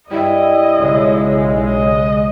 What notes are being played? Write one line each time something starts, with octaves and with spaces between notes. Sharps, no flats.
G2 G3 E4 D#5
B1 F#2 C#3 G#3
D#5